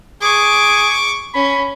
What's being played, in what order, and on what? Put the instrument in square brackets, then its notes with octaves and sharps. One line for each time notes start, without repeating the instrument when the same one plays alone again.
[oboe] G#4 [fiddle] C#6 D6
[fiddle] C#4 [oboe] B5